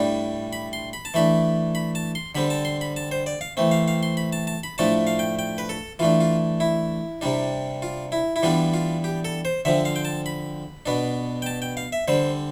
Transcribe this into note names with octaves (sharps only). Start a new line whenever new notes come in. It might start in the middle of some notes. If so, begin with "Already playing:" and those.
Already playing: A2 G3 D4
B5
C6
B5
A5
E3 A3 D4 B5
B5
A5
C6
D3 G3 C4 B5
A5
C6
B5
A5
C5
D5
F5
E3 A3 C4
F5
F5
C6
B5
A5
A5
B5
A2 F3 A3 D4 A5
F5
G5
G5
B4
A4
E3 A3 D4 F4
F4
E4
C3 G3 D4
F4
E4
E4
E3 G3 B3 D4 F4
F4
G4
A4
C5
D3 F3 C4 E5
F5
G5
A5
B5
B2 B3 D4
G5
A5
G5
F5
E5
D3 G3 C4 C5